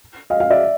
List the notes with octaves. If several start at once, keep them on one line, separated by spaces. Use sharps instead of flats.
D#5 F5
D#5 F5
D5 E5